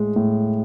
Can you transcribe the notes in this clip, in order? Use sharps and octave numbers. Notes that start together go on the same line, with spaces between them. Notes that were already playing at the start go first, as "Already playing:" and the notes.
Already playing: A2 G#3
A2